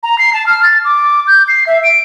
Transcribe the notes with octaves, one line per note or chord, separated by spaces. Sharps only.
A#5
C7
A5
F6
A6
D6
G6
C7
E5
D7